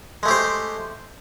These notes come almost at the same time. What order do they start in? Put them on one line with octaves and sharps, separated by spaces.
G#3 A3 G4 C5